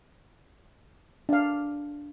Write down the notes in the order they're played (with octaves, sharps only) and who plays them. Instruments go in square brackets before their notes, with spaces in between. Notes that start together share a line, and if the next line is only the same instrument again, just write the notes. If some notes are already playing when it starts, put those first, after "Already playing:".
[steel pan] D4 F5